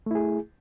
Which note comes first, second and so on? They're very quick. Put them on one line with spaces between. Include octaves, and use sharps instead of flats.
A3 E4 G#4